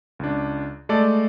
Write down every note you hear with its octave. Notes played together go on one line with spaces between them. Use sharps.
C#2 D4
G#3 A3 A4 D5